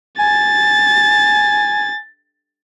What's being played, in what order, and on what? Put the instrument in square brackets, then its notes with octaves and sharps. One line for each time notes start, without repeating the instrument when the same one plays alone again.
[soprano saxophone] G#5 [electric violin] A6